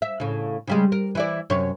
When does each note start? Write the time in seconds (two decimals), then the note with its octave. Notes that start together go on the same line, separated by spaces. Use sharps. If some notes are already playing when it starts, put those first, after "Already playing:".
0.02 E5
0.20 A2 C#3
0.67 C#3 G3 G#3
0.92 A#4
1.15 E3 E4 D5
1.50 F#2 C3 C#5